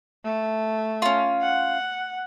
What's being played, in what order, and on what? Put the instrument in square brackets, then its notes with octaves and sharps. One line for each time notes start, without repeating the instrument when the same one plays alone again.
[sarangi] A3
[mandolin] C#4 F4
[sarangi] F#5